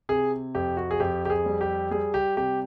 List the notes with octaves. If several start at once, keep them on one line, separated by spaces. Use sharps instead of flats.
C3 G#4
F2 G4
F#4
G#4
F2 G4
G4
G#4
G3
G4
G3 G#4
G4
C3 G4